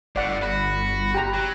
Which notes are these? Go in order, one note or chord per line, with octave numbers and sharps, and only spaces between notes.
G1 A2 D5 F#5
F#4 B5
G4 A#5 F#6
F#3